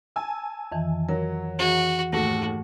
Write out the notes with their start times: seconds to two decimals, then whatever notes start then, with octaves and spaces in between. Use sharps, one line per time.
0.16 G#5 A5 E6
0.72 F2 D#3 E3
1.09 F#3 A#4
1.59 E3 F#4 G#4
2.12 D#2 G#2 A3 F#4 A4 A#6